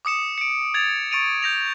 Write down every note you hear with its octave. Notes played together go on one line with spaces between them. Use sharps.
D6 D#6 C#7 E7
C#7 D7
G#6 A6 F7
C#6 A6 D7 D#7 F7
G6 A#6 F7